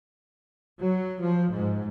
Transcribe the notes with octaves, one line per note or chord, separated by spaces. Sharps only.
F#3
F3
G#2